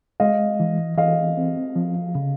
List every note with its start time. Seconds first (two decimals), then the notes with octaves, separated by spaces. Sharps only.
0.20 G#3 D#5 F5
0.60 E3
0.98 E3 D#5 F5
1.37 C4
1.76 F3
2.15 C#3